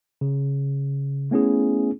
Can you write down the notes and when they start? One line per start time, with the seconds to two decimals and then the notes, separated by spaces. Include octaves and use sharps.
0.21 C#3
1.31 A3 B3 C#4 E4 G#4